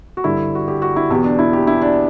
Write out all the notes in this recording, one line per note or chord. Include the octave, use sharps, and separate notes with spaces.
F#4
G2 D3 E4
F#4
G4
F#4
E4
E2 B2 G4
D4
E4
G4
E4
D4